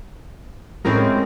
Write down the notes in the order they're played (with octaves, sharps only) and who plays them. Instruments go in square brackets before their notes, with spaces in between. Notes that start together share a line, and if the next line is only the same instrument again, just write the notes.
[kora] A2 E4 A#4 [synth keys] G#3 C4 C#4